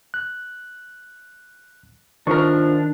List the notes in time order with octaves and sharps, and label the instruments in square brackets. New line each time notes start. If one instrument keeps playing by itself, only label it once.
[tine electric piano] F#6
[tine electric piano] D#3 [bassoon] F3 [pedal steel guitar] D4 [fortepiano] A#4 C#6